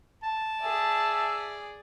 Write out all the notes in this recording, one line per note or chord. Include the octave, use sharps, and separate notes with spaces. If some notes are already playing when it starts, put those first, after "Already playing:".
A5
G#4 D5 E5